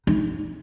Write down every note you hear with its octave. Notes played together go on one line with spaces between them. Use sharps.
D#4